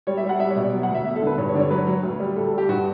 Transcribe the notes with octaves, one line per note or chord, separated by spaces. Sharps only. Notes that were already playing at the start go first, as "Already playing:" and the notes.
G3 C#5
E5
G3
F#5
G3 E5
C#5
B2
D5
F#3
F#5
D2
E5
E1 E5
A4
D3
B4
G2 C#5
C#5
D3 D5
C#5
F#3 B4
F#3
D2
G3
D2 A4
A4
G3
G4
G2 F#4